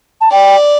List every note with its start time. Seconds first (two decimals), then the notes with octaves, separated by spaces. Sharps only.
0.21 A5
0.32 D5 G5